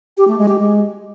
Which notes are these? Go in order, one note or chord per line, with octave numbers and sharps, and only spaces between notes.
G4
A3
G#3
G4
G#3